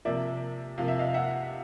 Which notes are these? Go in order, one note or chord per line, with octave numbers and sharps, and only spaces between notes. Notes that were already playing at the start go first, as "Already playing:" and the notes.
C3 F3 A#3 D5 E5
C3 F3 A#3 F5
E5
D#5 F5
E5 F#5